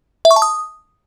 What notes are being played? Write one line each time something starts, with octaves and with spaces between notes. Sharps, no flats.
E5
C#6
A5
D#6